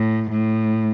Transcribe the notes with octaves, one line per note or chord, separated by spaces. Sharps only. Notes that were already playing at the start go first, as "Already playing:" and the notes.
Already playing: A2
A2